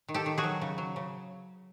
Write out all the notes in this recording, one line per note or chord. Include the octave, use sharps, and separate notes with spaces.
D#3
G4 A4
D#3
F#4 G#4
F#3
C#3
F#3
C#3